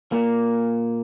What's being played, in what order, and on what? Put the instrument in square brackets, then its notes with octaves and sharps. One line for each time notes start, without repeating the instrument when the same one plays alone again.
[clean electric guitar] A#2 A#3